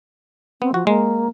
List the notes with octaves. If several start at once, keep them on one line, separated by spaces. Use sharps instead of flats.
B3 C4
F3 F#4
G#3 A#3